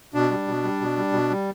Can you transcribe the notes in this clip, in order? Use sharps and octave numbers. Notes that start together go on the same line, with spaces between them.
B2 D4
G3
B2
G3
B2
G3
B2
G3